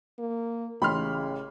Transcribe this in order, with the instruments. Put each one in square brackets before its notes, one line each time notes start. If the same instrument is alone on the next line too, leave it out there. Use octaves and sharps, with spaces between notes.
[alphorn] A#3
[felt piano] A1 [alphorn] C#3 [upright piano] B5 C6 F6